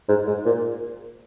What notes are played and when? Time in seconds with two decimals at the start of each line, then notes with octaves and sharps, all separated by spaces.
0.09 G#2
0.27 G#2
0.45 A#2